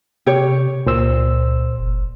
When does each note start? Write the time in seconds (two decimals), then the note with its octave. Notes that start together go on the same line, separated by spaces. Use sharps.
0.26 C3 G4 C#5
0.86 C#2 A#2 C5 E6
1.79 F#1